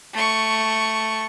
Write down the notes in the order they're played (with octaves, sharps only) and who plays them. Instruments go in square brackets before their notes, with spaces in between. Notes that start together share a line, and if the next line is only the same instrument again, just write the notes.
[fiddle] A3 C#6